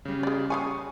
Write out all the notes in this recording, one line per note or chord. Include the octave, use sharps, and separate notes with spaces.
C#3 G3
G#4 D5
C#3 F5 G#5 C#6 D#6